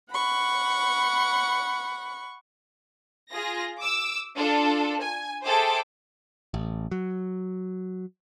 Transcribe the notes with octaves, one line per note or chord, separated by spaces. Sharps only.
F#5 B5 C#6
F4 G#4 A#6
D6 E6
D4 F4 A4
G#5
G#4 A4 C5 E5 G5 D6
A1
F#3